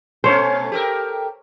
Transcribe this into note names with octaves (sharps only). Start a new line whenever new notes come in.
B2 A3 C#4 C5 C#5
G4 A4 A#4